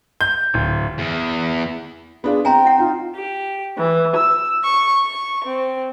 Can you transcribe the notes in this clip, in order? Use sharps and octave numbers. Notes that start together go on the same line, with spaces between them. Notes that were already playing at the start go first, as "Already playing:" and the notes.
G6
D1
E2
B3 D4 F4 G#4
C4 G5 G#5 A#5 C6
E4 F#5
D#4 F4
G4
E3
E6
C#6
C#6
C4